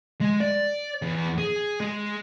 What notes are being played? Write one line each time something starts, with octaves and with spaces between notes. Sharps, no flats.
G#3
D5
E2
G#4
G#3